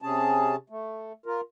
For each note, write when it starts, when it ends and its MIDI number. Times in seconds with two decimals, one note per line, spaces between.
0.02 0.56 48
0.02 0.56 61
0.02 0.56 68
0.02 0.56 81
0.70 1.12 57
1.26 1.41 65
1.26 1.41 70